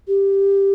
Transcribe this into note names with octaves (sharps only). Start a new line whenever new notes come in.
G4